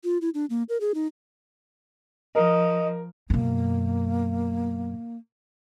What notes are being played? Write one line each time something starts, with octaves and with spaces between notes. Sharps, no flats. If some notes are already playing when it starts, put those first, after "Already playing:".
F4
E4
D4
A#3
A#4
G#4
D#4
F3 A#4 D#5
F#2 B2 A#3